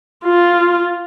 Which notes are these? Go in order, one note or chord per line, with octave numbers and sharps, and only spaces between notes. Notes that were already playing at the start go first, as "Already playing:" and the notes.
F4